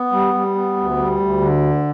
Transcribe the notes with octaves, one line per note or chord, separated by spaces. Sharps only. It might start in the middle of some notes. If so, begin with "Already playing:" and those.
Already playing: B3
G3
G3
B3
D2
G3
D2
D3